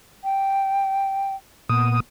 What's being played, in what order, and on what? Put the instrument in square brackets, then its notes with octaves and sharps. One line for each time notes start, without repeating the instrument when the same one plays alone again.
[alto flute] G5
[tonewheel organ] A#2 D#6 [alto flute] B3